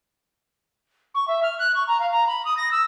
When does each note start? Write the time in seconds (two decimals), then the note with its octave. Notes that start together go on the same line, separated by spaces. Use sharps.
1.15 C#6
1.28 E5
1.43 F6
1.59 F#6
1.75 C#6
1.88 A#5
2.00 F5
2.11 A#5
2.27 B5
2.45 D#6
2.57 A#6
2.71 E6